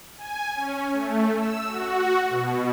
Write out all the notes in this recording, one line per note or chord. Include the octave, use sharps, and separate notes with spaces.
G#5
C#4
A3
E6
F#4
B2